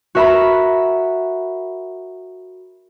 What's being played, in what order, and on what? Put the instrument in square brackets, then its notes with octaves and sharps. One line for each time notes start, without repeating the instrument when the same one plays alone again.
[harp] F#4 A#4 E5 A#5 B5